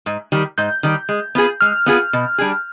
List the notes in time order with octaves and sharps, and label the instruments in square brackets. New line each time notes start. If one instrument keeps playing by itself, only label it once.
[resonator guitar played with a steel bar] G#2
D#3 G3
[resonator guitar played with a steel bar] G#2 [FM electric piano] G6
[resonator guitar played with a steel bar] D#3 G3
G#3
B3 F4 G#4
[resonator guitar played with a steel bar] G#3 [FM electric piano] F6
[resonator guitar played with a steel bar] B3 F4 G#4
B2
G3 D4 G#4